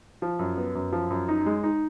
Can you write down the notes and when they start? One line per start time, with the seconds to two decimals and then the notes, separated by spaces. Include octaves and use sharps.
0.22 F3
0.39 F#2
0.57 B3
0.75 F#2
0.92 F3
1.10 F#2
1.28 D#4
1.46 G#3
1.63 D#4